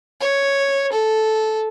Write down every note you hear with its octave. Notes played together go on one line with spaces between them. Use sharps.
C#5
A4